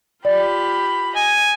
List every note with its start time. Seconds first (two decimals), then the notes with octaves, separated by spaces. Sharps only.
0.25 F4 G4 D5 B5
1.16 D#5 G#5